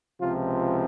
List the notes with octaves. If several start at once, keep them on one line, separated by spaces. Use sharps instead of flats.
C#2 C3 F3 F4